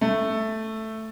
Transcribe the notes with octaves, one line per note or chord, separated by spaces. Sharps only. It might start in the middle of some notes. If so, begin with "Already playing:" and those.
A3